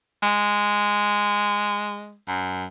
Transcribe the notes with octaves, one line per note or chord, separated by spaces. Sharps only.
G#3
F#2